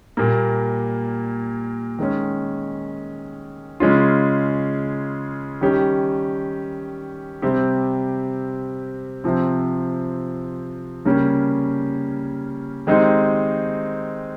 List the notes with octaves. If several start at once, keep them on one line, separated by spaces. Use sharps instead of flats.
A#2 G3 A#3
D#3 G#3 C#4
C#3 G#3 C#4 F4
D#3 G3 C#4 G4
C3 G3 C4 G4
C3 F3 C4
C#3 G3 A#3 C#4 G4
D#3 G#3 C4 D#4 G4